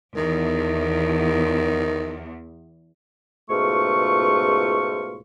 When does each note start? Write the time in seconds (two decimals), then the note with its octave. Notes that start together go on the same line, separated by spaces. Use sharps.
0.16 E2 D#3
3.50 C#2 G#2 B2 A3 F4 C#6